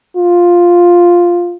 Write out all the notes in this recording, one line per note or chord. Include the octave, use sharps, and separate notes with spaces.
F4